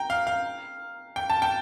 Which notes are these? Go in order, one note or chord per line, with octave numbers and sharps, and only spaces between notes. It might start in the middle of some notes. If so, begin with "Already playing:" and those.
Already playing: G5 A#5
F5
F5
G5
A5
G5